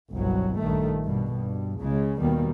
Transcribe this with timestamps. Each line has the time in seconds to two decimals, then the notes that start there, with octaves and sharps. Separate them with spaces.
0.11 G1 C2 B2 F#3
0.58 A#1 G2 D#3 A3
1.04 G2 B2
1.32 G2
1.80 C#2 C#3 G#3
2.19 D#2 B2 D#3 G3 A#3